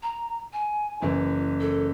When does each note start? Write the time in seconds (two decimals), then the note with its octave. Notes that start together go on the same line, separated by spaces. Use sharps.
0.03 A#5
0.53 G#5
1.02 F#1 E3 E4 G#5
1.60 A4